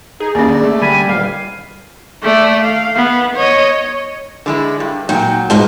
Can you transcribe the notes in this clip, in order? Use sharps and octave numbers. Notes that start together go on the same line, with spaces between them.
D#4 G#4
D#2 A#3 C#4 D5
D3
A3
D3 G3 G#5 B5
D#1 G3 F5
A3 D5
F5
B3
C#5 D#5
D3 G#3 E4
G2
A#2 F#3 D#4 G5
G#2 B2 G#3 F4 A5